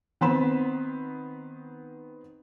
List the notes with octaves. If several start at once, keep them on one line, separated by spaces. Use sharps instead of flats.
D#3 B3 C4 B5 E7